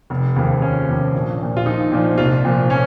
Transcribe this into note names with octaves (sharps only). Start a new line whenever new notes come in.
F1
D#2 C#3 F3
F1 C#4
D#2 C#3 F3
A#1
A#2 F3
F4
A#1 D#4
A#2 F3
C2 F4
A#2 F3
C#4